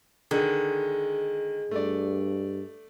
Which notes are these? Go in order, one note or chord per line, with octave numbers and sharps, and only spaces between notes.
D3 D#3 G#3
G2 A3 D5